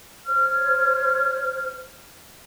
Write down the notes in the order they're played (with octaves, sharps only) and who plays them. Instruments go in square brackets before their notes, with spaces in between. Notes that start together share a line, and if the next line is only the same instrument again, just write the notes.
[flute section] C5 C#5 F6